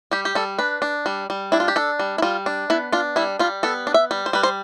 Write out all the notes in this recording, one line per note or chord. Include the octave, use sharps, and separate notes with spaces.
G3 G4
G4
G3 A4
D4 B4
D4
G3
G3
D4 E4
F4
G4
D4 A4
G3
E4
G3 F4
D4
B3 E4
D4 F4
G3 E4
G3 F4
B3 A4
D4
E5
G3
C5
G3 B4
C5